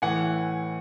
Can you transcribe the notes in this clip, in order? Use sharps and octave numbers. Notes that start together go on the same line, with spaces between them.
A2 E3 F#5 G#5